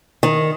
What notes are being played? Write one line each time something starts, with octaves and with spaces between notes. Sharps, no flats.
D#3